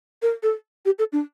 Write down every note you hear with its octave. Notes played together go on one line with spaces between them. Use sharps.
A#4
A4
G4
A4
D4